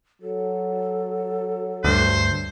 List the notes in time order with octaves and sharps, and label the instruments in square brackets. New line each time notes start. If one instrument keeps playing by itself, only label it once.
[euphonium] F#3 [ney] A4
[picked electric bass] D2 G2 [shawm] C5